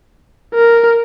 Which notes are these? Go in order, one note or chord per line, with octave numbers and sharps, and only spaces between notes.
A#4